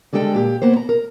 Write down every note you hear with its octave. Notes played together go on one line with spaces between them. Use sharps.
D3 G3 G#3 A4 G5
A#2 G4
A#3 B3 C5
A#5
A#4